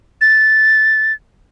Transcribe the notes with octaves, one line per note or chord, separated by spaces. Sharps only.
A6